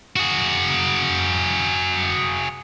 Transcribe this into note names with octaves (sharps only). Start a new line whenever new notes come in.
F#4 G#4